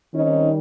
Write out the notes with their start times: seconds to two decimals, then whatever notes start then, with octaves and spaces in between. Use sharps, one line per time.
0.14 D#3 G3 C4 C#4 D#4